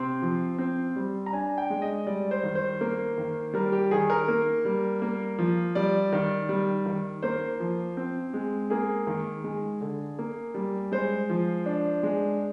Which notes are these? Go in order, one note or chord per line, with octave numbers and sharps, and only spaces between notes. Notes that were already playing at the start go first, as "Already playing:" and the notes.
Already playing: C3 C4 C6
F3
C4
G3
A#5
D4 G#5
G5
G#3
D#5
G3 D5
C5
D#3
C5
A#3
D#3
G3 A#4
G4
D#3 G#4
A#4
A#3
G3
A#3
F3
G3 D5
D#3
G3
D#3
A#3 C5
F3
C4
G#3
A#3 G#4
D#3
G#3
D3
A#3
G3
G#3 C5
F3
D4
G#3